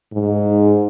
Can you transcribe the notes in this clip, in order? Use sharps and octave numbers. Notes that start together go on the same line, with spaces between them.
G#2